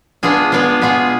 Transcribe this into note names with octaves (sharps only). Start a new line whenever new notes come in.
G#3 B3 D4 F4 G#4
G#3 B3 D4 F4 G#4
B2 B3 F4 G#4